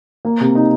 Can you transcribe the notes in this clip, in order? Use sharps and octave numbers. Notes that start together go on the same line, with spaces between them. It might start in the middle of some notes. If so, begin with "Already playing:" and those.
A#3
C3
D#4